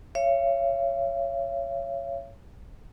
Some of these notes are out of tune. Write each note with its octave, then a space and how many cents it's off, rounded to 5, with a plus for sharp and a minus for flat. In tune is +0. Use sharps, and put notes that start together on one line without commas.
C#5 +0 F5 -45